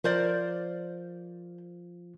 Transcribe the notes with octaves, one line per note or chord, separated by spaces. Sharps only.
F3 A#4 C5 D5